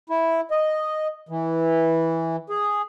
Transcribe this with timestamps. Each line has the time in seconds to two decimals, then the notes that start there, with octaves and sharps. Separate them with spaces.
0.10 E4
0.51 D#5
1.29 E3
2.50 G#4